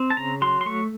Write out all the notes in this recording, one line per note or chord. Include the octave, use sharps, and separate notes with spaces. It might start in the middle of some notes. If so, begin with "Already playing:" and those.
Already playing: C4
A5
C#3 A#5
F#3 C6
C6
A3 C#6